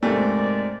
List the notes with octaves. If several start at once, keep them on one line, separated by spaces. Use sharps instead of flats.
G#2 C3 G#3 A3 A#4 D5